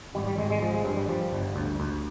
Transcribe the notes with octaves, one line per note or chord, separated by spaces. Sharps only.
G#1 G3
G3
G#1 G#3
G#3
F3 G#3
G#3
G2 G3
G3
F3 G3
G1
D2
D2